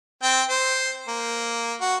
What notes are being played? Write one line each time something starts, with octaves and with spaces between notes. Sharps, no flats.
C4 G5
C5
A#3
F#4